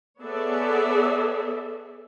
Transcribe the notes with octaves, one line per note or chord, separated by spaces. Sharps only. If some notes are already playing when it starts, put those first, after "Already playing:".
B3 G#4 A4 C#5 D5 E5